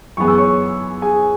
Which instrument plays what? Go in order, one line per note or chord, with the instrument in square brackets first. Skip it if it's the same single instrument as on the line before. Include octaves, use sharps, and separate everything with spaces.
[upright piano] F#2 E3 B3 G#4 [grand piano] C#6
[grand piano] E6
C#5 C#6
G#4 G#5